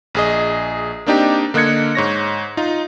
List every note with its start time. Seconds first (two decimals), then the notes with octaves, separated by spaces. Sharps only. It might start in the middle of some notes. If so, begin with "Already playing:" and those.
0.15 A#1 G#4 D#5
1.06 A#3 C4 D4 D#4 G4
1.54 D3 A#3 D#5 F#6 G#6 C#7
1.95 G#2 C#5 A#6
2.57 D#4 F4